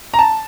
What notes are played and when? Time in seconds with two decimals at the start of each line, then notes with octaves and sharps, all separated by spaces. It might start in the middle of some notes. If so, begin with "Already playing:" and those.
0.14 A#5
0.19 A5